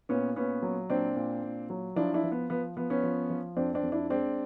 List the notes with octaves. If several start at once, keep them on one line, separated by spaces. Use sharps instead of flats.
A#2 B3 C#4
A#2 B3 C#4
F#3
A#2 C4 D4
A#2
A#2
F#3
F3 D4 E4
D4 E4
F3
B3
F3 B3
F3 B3
B3 C#4
F3
F3
F2 C4 D4
C4 D4
F2
D4 E4
G#3 C4 D4